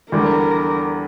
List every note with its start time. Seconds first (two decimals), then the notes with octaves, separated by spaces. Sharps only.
0.11 E2 D3 G3 A#4